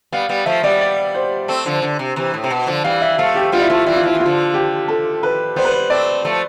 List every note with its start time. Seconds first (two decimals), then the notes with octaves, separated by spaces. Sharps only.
0.12 G3 B3 F5
0.29 G3 B3
0.46 F3 A3 E5
0.63 G3 B3 D5
0.81 D5
1.15 C5
1.48 A3 C4
1.65 D3 F3
1.82 D3
1.99 C3
2.16 C3 E3
2.34 A2
2.44 C3
2.51 B2
2.67 D3 F3
2.84 E3 G3 F5
3.02 E5
3.18 F3 A3 F5
3.35 G4
3.52 G3 B3 F4
3.62 E4
3.70 F3 A3 F4
3.86 E3 G3 E4
3.96 F4
4.03 F3 E4
4.15 E3
4.20 F4
4.26 D3 F3
4.54 G4
4.88 A4
5.23 B4
5.56 G3 B3 C5
5.65 B4
5.72 C5
5.90 A3 C4 D5
6.25 F3 A3